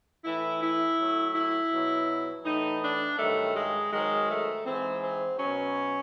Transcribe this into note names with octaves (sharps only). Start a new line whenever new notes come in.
A2 E3 E4
E4
A2 F#3
E4
B2 F#3
A2 E3 D#4
D4
G2 D#3 F#3 A3
G#3
G#2 D#3 F#3 G#3
A3
G#2 E3 C4
C4
B2 F#3 C#4